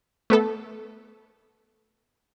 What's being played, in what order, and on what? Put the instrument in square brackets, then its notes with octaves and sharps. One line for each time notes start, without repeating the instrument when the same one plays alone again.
[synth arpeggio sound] A3 B3 A4